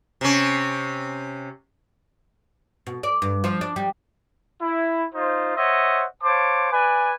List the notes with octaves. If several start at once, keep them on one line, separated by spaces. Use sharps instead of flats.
C3 C#4
B2
D5
G2
F3
D4
G3
E4
D#4 F4 C5
C5 C#5 D#5 E5 F#5
C5 C#5 F5 A5 D6
B4 D5 G#5